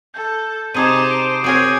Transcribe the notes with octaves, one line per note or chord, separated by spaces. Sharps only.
A4 G6
C3 D#4 G#4 C5 A5 D6 D#6 D#7
C7 D7
C4 F#4 G#4 A#4 C#5 G#5 G6